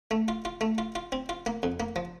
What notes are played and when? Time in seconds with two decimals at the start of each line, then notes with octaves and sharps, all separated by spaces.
0.11 A3
0.28 F4
0.45 F4
0.61 A3
0.78 F4
0.95 F4
1.12 C4
1.29 F4
1.46 A#3
1.63 F2
1.80 A#3
1.96 F3